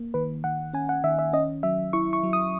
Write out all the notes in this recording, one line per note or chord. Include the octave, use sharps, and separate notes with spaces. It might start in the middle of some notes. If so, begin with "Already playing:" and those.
Already playing: A#3
D#3 B4
D#3 F#5
C#4 G#5
F#5
D#3 E5
E5
C#4 D#5
F#3 E5
E4 C#6
C#6
F#3
D#6